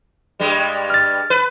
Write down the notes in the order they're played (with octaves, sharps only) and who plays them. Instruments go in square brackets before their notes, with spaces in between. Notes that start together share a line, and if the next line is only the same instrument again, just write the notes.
[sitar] G2 G3 G#3
[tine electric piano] F6 A6
[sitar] B4